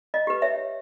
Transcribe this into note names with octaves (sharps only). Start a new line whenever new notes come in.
D#5
G4 B4
C#5 E5